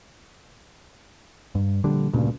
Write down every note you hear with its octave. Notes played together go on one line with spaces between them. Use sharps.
G2
A#1 D3 G3 D4
D2 G2 A#2 C#3